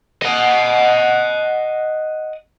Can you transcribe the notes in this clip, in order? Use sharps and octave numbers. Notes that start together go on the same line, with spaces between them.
D#5 F#5